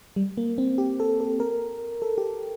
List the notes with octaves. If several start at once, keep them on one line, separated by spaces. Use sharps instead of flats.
G3
A#3
C4
G4
A4
A4
A#4
A4
G4